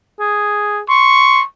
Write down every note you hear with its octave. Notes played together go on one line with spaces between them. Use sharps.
G#4
C6 C#6